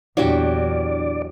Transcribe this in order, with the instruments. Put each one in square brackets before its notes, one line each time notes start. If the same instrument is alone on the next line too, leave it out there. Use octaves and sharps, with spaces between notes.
[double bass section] E2 [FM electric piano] A#2 D4 E4 [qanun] F#3 F#4 G4 [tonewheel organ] D5